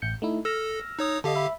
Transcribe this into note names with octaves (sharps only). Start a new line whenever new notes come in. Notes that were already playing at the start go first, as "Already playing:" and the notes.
A1 G6 C#7
A3 D#4 E4
A4 E6 F6 A#6
D#4 C#5 D#6
D3 G4 A4 D#5 F5
E5 B5